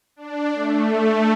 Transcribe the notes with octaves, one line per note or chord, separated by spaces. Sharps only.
D4
A3